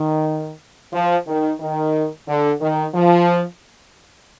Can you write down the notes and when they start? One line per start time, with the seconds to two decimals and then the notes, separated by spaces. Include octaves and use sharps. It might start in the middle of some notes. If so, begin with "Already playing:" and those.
Already playing: D#3
0.93 F3
1.27 D#3
1.60 D#3
2.28 D3
2.61 D#3
2.95 F3